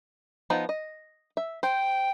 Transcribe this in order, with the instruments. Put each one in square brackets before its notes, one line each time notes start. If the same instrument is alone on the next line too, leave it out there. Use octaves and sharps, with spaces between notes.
[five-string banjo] F3 B3 D#4
D#5
E5
[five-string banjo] C5 [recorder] G5